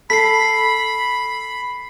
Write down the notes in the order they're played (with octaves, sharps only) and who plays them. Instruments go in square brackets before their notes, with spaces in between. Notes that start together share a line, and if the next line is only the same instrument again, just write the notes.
[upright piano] A4 [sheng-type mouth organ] B5 [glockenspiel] B6 C7